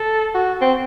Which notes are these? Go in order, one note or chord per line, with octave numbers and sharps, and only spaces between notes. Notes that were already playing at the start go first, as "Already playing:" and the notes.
Already playing: A4
F#4
C4